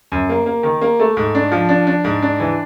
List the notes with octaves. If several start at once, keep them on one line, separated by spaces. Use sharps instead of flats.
F#2
A#3
A#3
D#3
A#3
A3
G#2
D4
F3
D4
D4
G#2
D4
E3